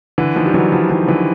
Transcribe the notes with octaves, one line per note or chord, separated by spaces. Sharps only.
D3 E3
D#3 F3
G3
E3 F#3
F3 G3
D#3 F3
D3 E3